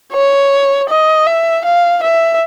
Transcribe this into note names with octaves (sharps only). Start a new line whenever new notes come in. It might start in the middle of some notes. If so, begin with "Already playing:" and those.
C#5
D#5
E5
F5
E5